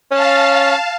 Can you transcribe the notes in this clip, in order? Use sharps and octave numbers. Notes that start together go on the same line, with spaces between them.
C#4 F5 A5